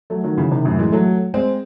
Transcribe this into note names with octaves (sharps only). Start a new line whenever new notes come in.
F#3 A3
D#3 F#3
C#3 E3
C3 D#3
F#2 A2
E3 G#3
F#3 A3
G#3 C4